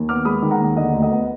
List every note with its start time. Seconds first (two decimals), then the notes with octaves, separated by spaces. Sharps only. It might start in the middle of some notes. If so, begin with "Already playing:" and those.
Already playing: D#2
0.09 B3 D6 F6
0.25 G#3 B5 D#6
0.42 D#3
0.51 F#5 A#5
0.60 D#2
0.76 D3 D#5
0.93 D2
1.02 D#5
1.11 B3